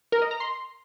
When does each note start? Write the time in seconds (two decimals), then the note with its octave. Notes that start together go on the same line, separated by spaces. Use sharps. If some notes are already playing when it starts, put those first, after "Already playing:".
0.12 A#4
0.22 D#5
0.31 A#5
0.40 C6